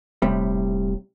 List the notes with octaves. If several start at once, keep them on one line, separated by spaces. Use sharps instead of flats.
D#1 A2 C3 G3